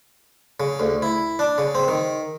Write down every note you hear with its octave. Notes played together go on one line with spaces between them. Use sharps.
C#3
D2
E4
D4
C#3
C4
D#3